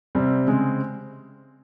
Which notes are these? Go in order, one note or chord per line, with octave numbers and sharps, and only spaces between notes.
C3 G3 C4
C#3 G#3 C4